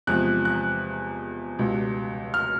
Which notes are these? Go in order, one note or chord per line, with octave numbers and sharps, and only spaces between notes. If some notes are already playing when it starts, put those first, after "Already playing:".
E2 C3 F3 G#3 F#6
F#6
C#2 B2 G3
F6